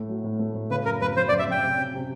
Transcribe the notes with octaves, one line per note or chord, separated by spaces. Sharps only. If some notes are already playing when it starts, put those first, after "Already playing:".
Already playing: A2 A3
F#3
A2
A3
A2
C#3 B4
F#2 A#4
F#2 B4
F#2 C5
D5
F#2
E5
F#2 G5
C3
C#4
C3